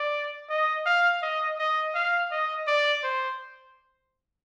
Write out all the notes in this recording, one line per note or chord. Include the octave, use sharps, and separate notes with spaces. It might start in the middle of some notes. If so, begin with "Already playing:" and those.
Already playing: D5
D#5
F5
D#5
D#5
F5
D#5
D5
C5